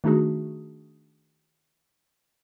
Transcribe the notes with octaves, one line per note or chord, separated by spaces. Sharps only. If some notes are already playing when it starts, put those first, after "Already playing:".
D#3 A3 D4 D#4 F#4 G#4